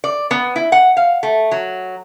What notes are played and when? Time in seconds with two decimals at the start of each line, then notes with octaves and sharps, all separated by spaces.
0.04 D5
0.31 B3
0.56 E4
0.72 F#5
0.97 F5
1.23 A3
1.51 F#3